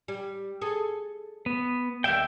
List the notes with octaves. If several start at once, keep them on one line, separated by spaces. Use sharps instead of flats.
G3
G#4 A4
B3
D#2 G3 E5 F5 G5